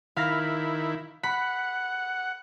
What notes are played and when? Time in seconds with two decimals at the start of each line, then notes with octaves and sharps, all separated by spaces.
0.17 D#3 E4 F5 B5 A#6
1.23 F#5 B5